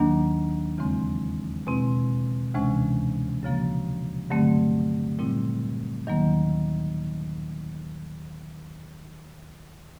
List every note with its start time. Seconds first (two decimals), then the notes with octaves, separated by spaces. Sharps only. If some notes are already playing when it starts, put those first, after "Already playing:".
Already playing: D#2 D#3 F#3 A#3 D4
0.78 E2 C#3 E3 G#3 C4
1.67 B2 G#3 C4 E4
2.54 D2 C3 E3 G#3 C#4
3.43 F#2 C#3 F3 A#3
4.30 G2 D3 F#3 A3 C4
5.19 A#2 G3 C4 E4
6.07 D#2 D#3 F#3 A#3